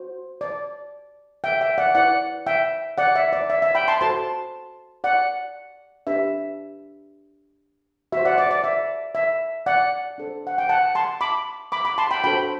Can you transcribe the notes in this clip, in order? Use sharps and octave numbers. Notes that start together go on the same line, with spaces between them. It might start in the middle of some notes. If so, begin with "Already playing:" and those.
Already playing: F#4 C5
D5
E5 G5
E5 G5
D5 F#5
E4 B4 D5 F#5
E5 G5
D5 F#5
E5
D5
E5
E5
G5 B5
A5 C6
F#4 A4 C5 A5 C6
D5 F#5
D4 G4 B4 E5
F#4 C5 E5
D5 F#5
D5
D5
E5
E5
D5 F#5
D4 A4 C5
F#5
G5
F#5 A5
A5 C6
B5 D6
B5 D6
B5 D6
A5 C6
G5 B5
D4 F#4 A4 C5 G5 B5